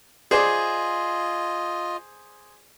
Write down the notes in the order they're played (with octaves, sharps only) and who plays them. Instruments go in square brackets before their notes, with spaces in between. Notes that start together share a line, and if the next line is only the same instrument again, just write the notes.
[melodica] F4 D#5 [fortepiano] G#4 C5 D5